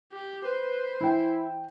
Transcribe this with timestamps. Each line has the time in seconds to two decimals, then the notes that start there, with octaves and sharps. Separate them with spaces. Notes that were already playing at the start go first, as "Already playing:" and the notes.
0.13 G4
0.45 B4 C5
1.00 E3 E4 G5